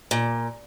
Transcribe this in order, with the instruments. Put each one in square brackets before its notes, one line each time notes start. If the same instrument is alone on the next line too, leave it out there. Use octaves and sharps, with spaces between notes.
[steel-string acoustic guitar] A#2